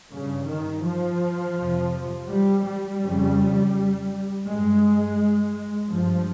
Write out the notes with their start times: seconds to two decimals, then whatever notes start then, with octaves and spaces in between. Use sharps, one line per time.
0.11 G2 C#3
0.47 D#3
0.84 F3
1.56 F2 C3
2.29 G3
2.64 G3
3.01 F2 C#3
4.46 G2 G#3
5.90 G2 F3